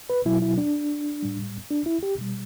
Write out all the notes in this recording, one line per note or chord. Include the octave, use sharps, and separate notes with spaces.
B4
B2 F#3 E4
E4
D4
A2 G3
D4
E4
G4
B2 G3